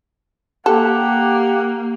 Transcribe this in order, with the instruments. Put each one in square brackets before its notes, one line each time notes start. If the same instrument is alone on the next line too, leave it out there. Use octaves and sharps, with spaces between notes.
[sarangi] A#3 [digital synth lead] G4 [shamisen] A4 [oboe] F#5